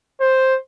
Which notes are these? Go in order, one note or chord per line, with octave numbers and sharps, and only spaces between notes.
C5